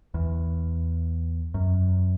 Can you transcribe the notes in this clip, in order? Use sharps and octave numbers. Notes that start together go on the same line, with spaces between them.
E2
F#2